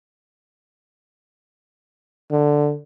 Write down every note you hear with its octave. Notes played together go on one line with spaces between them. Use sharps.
D3